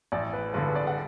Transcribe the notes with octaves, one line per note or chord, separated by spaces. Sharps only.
A1 D5
B4
G2 D3 B4
D5
F#5